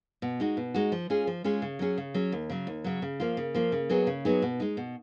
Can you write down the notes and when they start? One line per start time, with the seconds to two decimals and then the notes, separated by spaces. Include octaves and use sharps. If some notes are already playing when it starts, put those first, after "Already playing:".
0.22 B2
0.40 G#3 D#4 F#4
0.57 B2
0.74 G#3 D#4 F#4
0.92 F3
1.10 G#3 C#4 F4 G#4
1.27 F3
1.44 G#3 C#4 F4 G#4
1.62 C#3
1.79 F#3 C#4 G#4
1.97 C#3
2.14 F#3 C#4 G#4
2.32 D#2
2.50 C#3 F#3
2.67 D#2
2.84 C#3 F#3
3.02 C#3
3.20 F3 A#3 F4
3.37 C#3
3.55 F3 A#3 F4
3.72 C#3
3.90 F#3 B3 D#4 G#4
4.07 C#3
4.25 F#3 B3 D#4 G#4
4.42 B2
4.60 G#3 D#4
4.77 B2